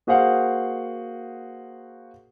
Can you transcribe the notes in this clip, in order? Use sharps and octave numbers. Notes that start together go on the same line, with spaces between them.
A#3 F#4 G#4 C5 F5 F#5